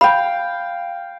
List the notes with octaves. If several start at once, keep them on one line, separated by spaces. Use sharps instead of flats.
F5 G5 B5